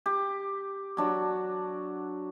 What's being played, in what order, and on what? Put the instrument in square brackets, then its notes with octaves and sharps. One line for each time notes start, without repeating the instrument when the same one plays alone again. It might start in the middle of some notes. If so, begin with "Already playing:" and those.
[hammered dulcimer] G4
F#3 D4 F#4